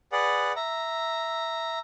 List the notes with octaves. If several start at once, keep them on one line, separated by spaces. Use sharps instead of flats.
G#4 B4 D5 F#5
E5 A#5